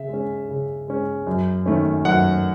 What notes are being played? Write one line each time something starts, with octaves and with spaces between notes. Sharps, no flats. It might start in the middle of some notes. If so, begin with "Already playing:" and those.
Already playing: C#3 E5
G#3 C#4
C#3
G#3 C#4
F#2
D#3 A3 C#4
F#2 F#5